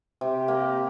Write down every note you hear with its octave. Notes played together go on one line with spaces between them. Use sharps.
C3 G4
A#3